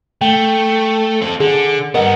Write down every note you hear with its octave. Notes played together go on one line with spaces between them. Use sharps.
A3 G5
C4 A4
D3 G#4
G2 B3 A#4 D#5 F#5